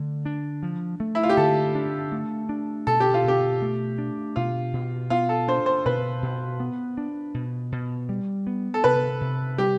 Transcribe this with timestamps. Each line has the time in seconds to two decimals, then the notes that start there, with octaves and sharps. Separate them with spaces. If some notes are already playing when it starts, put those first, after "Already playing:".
Already playing: D3 A3
0.26 D4
0.63 F3
1.00 A3
1.15 E4
1.23 F4
1.29 G4
1.37 D3 A4
1.75 D4
2.12 A3
2.49 D4
2.87 B2 A4
3.00 G4
3.14 F4
3.24 B2 G4
3.62 A3
3.98 D4
4.36 B2 F4
4.73 B2
5.10 B3 F4
5.29 A4
5.48 D4 C5
5.66 C5
5.85 B2 B4
6.22 B2
6.60 B3
6.98 D4
7.34 B2
7.72 B2
8.09 G3
8.47 B3
8.74 A4
8.84 C3 B4
9.21 C3
9.58 G3 G4